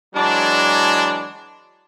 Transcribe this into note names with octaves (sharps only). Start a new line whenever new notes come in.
E3 F#3 G#3 D4